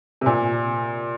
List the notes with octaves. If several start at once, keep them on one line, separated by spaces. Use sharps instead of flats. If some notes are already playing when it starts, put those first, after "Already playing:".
C3
A#2